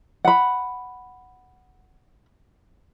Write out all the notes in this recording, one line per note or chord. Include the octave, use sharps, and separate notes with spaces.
F#5 B5